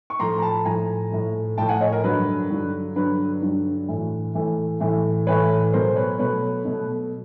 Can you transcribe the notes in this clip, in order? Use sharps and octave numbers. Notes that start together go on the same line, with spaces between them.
C#6
A2 F3 A3 A#5 C6
A#5
A5 B5
A2 F3 A3 G#5 A#5
A2 F3 A3
A2 F3 A3 G5 A5
F#5 G#5
C#5 D#5
A#4
G2 D3 F#3 B4
G2 D3 F#3
G2 D3 F#3 B4
G2 D3 F#3
A2 E3 A3
A2 E3 A3
A2 E3 A3
A2 E3 A3 B4 C#5
B2 F#3 A3 A#4 C5
B4 C#5
B2 F#3 A3 B4 C#5
B2 F#3 A3